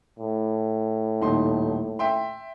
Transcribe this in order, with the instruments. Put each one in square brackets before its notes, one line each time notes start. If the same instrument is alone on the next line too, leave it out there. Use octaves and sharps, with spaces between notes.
[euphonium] A2
[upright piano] D#1 D#4 C6
E5 G5 C6